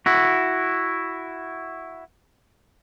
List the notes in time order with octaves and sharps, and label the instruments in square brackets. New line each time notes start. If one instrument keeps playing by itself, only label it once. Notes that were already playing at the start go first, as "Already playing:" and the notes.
[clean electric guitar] E4 F#4